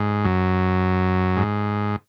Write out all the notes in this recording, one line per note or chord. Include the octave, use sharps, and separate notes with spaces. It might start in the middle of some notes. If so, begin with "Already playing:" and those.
Already playing: G#2
F#2
G#2